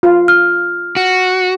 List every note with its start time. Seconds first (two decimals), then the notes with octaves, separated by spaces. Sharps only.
0.03 F4
0.28 F6
0.96 F#4